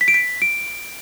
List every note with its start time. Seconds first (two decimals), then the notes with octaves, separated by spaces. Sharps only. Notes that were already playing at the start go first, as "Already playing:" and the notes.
0.01 B6
0.08 D7
0.14 B6
0.42 D7